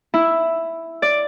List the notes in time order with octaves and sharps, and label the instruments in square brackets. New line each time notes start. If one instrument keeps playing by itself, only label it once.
[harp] E4
D5